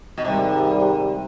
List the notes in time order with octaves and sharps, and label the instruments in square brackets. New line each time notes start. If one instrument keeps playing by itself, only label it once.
[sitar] B2
[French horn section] G#2 D#3 G3 [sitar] C3